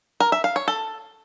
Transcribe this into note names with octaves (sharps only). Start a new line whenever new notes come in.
A#4
E5
F5
C#5
A4